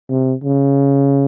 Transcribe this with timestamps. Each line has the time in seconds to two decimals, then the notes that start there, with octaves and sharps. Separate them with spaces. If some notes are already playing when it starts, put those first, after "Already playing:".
0.09 C3
0.44 C#3